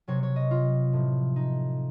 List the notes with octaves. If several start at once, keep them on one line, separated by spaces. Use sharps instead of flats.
C3 F#3 C#5
C#5
D#5
F4
A2 F3
D#4